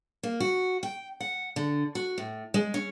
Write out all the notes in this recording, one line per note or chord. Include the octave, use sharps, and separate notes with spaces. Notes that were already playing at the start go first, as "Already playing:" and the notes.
A#3
F#4
G5
F#5
D3
F#4
A2
G#3
C#4